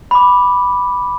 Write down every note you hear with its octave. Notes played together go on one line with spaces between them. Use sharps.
B5 D6